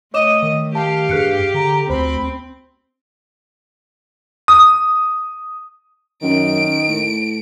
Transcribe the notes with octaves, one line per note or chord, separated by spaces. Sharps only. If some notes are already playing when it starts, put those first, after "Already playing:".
A3 C#5 D#5 D6 E7
D#3
G4 F5 A5
G2 G#4 F#6 C#7
D3 A#5
D2 C4 C5 B5
D#6
F#2 D#3 D7
A2